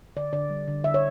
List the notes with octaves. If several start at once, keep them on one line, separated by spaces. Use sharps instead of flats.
D3 D5
D3 D5
G3
D3
D3 E5
C#5